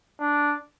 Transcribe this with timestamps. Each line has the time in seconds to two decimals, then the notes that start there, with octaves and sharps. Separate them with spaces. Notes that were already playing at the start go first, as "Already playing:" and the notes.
0.20 D4